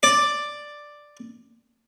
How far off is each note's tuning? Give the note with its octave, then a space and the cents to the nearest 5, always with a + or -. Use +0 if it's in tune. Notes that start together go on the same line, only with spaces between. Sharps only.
D5 +5